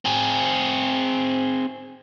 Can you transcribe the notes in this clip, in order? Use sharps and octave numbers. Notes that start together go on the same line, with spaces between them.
C4 G#4